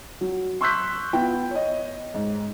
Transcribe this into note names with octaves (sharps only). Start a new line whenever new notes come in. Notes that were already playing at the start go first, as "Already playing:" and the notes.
F#3
C6 C#6 E6 F#6 G6 B6
B3 E4 F4 G5
C#5 D#5
G#2